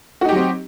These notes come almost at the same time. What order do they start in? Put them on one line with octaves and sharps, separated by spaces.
F#4 D#4 G4 F#3 C4